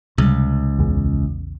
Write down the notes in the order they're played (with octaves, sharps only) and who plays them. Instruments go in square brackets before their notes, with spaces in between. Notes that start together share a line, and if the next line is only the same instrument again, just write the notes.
[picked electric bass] C#2 [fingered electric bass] C3 G3
[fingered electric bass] A#1 E2 C#3